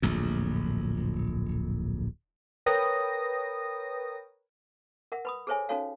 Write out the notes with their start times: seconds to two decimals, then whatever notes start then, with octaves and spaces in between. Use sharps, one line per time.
0.02 D1 A#1 F2
2.66 A#4 B4 C#5 G5 D#6 A#6
5.12 A#4 E5 F#5
5.25 B4 B5 D#6
5.47 G#4 A4 C5 C#5 E5 G#5
5.69 C#4 D#4 F#4 A4 C#5 F5